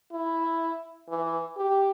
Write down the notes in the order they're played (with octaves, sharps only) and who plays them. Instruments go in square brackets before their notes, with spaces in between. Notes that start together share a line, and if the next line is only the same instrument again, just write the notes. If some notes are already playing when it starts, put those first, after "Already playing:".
[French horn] E4
E3
G4